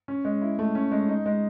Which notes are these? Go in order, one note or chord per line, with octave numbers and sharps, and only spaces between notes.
C#4
G#3
E4
A3
C#4
G#3
D#4
G#3